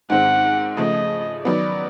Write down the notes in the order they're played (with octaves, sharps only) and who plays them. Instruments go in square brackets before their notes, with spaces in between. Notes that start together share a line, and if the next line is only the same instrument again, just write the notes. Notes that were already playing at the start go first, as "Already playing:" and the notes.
[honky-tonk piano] G#2 D#3 G#3 C4 [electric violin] F#5
[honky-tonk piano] C#3 F3 A3 [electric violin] D#5
[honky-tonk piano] D#3 F#3 B3 [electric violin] D5